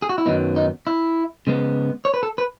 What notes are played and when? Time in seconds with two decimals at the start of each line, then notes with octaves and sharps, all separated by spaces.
0.02 G#4
0.09 F#4
0.18 E4
0.26 F#2 D#3 F#3 B3 D#4
0.56 D#4
0.87 E4
1.47 C#3 G#3 B3
2.05 C#5
2.14 B4
2.23 A4
2.38 B4